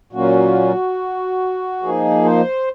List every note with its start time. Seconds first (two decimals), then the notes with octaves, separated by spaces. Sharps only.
0.13 A#2 F#3 A#3 C#4 F4 F#4
1.82 F3 A#3 D#4 G#4
2.25 C5